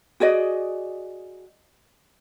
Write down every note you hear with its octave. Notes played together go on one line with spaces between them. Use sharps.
F#4 G#4 D5 D#5